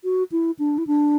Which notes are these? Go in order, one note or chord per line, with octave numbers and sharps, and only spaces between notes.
F#4
E4
D4
E4
D4